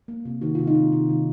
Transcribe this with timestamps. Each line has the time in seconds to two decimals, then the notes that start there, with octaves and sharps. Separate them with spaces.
0.08 A#3
0.25 C3
0.41 D#3 F#4
0.55 F4
0.59 C3
0.67 D#4
0.75 C3
0.92 C3
1.09 D#3